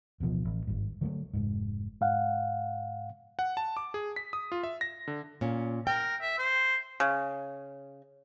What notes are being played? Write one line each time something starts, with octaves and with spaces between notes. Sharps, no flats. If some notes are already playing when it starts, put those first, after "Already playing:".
D1 A1 B2 F3
A1
G#1 G2
D3 F#3 G#3 A3
F1 G#2
G#2 F5 F#5
F#5
A5
D6
G#4
B6
D#6
F4
E5
A#6
D3
A#2 C#4
A#4 G5
E5
C5
C#3